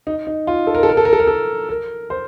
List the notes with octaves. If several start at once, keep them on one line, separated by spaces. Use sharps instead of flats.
D#4
D#4
F4
A4
A#4
A4
A#4
A4
A#4
A4
A#4
A4
A#4
C5